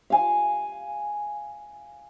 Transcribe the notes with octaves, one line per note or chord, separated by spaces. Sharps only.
F5 G#5